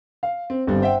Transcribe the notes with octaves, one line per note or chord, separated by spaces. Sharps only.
F5
C4
G1 G3 C4
C5 E5 F#5 G5